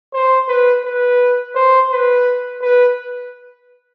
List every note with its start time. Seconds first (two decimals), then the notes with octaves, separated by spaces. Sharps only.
0.14 C5
0.49 B4
0.85 B4
1.56 C5
1.91 B4
2.62 B4